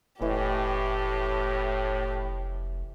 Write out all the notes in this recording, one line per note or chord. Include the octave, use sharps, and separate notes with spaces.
F1 A2 E3 G4 D#5